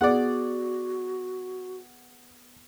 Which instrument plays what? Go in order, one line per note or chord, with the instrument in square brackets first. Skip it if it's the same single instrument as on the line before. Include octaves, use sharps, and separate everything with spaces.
[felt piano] B3 G#4 [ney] F#4 [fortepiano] D5 F#5